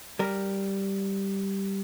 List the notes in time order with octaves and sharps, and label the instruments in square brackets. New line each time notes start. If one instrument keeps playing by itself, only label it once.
[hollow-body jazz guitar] G3 A#4